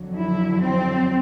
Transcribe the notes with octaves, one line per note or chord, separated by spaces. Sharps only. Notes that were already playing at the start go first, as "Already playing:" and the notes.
Already playing: F2 D3 F#3
E4
C4